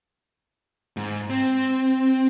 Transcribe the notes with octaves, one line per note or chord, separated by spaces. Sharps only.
G#2
C4